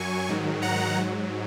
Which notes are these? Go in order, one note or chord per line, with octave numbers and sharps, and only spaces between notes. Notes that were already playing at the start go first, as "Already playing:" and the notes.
Already playing: F#2 F#3 G#5 C#6
G#2 D#3 F#3
F#5 A#5
G#2 F#3